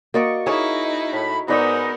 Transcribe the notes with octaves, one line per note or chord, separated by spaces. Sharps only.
A#3 F#4 D5 D#5 C#6
D#4 E4 G#4 A#4 C#5
A2 B5
G#2 G#3 B3 D#4 A#4 B4 D5 C#6